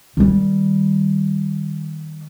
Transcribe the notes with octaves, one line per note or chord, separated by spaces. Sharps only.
D#3 G3